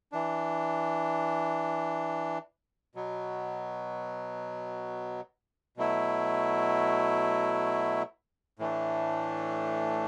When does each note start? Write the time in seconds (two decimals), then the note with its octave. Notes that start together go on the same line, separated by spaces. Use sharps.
0.12 E3 D4
2.95 B2 F#3 B3
5.77 B2 F#3 A3 E4
8.59 A2 E3 A3 D4